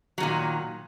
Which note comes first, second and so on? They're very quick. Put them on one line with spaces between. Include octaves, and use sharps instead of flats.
F#3 D#3 A#2